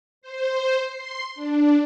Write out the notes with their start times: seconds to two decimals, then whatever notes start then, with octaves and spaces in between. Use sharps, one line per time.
0.22 C5
0.89 C6
1.35 D4